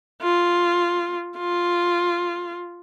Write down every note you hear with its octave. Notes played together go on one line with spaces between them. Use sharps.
F4
F4